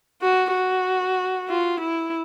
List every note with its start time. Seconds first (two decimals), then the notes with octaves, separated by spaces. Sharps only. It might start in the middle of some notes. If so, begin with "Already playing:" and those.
0.22 F#4
0.54 F#4
1.49 F4
1.81 E4